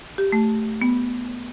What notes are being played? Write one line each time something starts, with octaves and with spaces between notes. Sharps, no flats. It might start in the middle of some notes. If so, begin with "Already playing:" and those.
G4
A3
B3